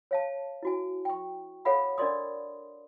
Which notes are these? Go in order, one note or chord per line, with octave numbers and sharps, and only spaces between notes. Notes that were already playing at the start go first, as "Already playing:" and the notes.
C#5 F5 A5
E4 F#4 G#5
G5 C#6
A4 C#5 F5 F#5 B5
D4 A#4 D5 D#5 C6 D#6